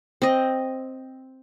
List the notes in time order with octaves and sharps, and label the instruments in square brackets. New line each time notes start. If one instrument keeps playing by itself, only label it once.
[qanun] C4 D#5